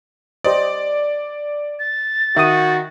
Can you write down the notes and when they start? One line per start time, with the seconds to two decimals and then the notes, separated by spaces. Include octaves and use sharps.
0.44 G4 C5 D5 D#5
1.79 A6
2.36 D#3 F#4 E5 D#6